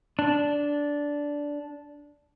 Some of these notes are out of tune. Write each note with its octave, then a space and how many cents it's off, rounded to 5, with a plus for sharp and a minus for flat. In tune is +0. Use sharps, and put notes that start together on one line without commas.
D4 -10